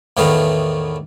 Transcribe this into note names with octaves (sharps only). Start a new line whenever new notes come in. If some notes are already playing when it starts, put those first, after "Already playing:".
E2 A2 D#3 A3 B3 F5